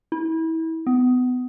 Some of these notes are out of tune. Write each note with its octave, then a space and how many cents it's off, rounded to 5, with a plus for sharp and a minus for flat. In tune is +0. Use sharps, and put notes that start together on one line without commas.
E4 -30
B3 +25